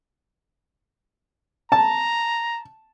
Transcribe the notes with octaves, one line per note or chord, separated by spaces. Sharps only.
A5 A#5